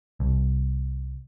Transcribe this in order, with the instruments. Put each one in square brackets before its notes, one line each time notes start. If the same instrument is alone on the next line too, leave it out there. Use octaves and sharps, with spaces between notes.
[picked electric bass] C2